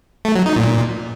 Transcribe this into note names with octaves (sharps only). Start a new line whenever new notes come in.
A3
F#3
D#4
A#2